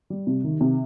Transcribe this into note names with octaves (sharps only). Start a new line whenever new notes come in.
G3
C3
D#3
C3